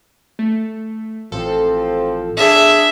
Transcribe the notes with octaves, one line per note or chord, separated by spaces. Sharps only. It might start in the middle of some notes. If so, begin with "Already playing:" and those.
A3
A1 F3 C4 A4
D4 G#4 E5